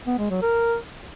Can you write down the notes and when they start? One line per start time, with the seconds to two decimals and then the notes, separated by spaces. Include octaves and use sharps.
0.07 B3
0.19 G#3
0.30 F#3
0.42 A#4